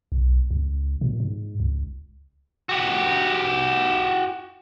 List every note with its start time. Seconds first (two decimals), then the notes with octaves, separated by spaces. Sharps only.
0.12 B1
0.51 C#2
1.01 A#2
1.20 G#2
1.60 C#2
2.69 F#4 G4